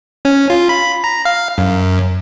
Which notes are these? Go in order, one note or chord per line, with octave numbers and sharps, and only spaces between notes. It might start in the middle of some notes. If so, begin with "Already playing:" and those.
C#4
F4
B5
A#5
F5
F#2